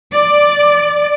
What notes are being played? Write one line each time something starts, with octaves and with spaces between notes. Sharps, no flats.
D5